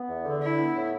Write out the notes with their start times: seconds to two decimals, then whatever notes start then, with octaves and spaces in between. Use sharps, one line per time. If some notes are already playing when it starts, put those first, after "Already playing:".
Already playing: B3
0.08 E2
0.25 D3
0.41 D4 E4
0.59 B3
0.75 A2